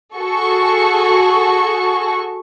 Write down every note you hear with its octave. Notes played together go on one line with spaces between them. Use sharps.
F#4 G#4 A4 C#6